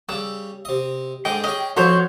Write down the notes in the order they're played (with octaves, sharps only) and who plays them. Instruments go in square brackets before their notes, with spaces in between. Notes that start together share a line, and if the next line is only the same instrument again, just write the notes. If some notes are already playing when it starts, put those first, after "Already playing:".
[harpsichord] C#3 G3 [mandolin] E6
[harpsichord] C3 D#5
[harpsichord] G#2 D3 G#4 [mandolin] D#5 [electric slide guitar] G5
[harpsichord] C#4 G#4 [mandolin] D#5
[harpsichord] F2 F#3 E4 [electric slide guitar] F3 F#4 [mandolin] C5 C#5 C6